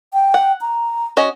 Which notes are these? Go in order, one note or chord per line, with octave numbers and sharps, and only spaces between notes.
G5
F#5
A#5
C#4 F#4 D#5